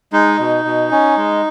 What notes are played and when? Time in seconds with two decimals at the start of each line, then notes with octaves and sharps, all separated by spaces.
0.13 G#3 D#4
0.39 B2
0.65 B2
0.91 C#4
1.17 G#3